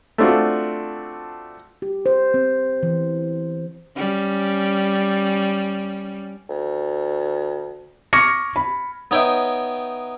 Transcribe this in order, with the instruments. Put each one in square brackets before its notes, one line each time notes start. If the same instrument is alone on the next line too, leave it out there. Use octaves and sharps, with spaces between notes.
[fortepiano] A3 C4 D4 F4 F#4
[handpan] G4
C5
C4
E3
[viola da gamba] G3 C#4
[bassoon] D2
[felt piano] C#6 D6 F6 G#6 A#6 C#7
B5
[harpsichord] B3 D#4 C#5 E5 G5